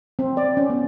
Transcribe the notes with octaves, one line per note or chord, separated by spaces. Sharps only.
C4
D5
C#4
B3